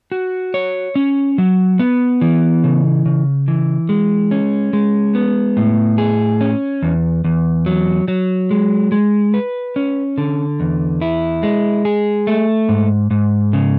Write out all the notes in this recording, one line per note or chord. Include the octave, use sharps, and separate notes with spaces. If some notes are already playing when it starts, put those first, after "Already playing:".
F#4
C#5
C#4
F#3
B3
E3
C#3
C#3
E3
G#3
C#4
G#3
B3
A2
G#4
C#4
E2
E2
F#3
F#3
G#3
G#3
B4
C#4
D3
E2
E4
G#3
G#4
A3
G#2
G#2
C#3